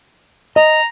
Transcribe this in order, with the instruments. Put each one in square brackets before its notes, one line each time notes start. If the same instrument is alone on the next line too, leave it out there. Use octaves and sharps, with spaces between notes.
[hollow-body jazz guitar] D#5 [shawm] A#5